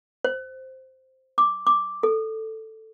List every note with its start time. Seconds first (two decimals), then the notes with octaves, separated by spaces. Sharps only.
0.24 C5
1.38 D6
1.67 D6
2.03 A4